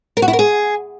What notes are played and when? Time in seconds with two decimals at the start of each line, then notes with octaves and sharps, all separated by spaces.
0.17 A#4
0.22 F#4
0.28 E4
0.33 A#4
0.39 G#4